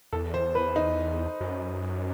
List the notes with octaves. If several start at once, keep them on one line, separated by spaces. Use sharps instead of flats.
E2 A4
C5
B4
D#4
F#2